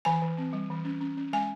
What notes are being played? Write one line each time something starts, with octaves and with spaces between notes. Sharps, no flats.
E3 G#5
E3
C4
G3
E3
C#4
C#4
C#4
G#3 G#5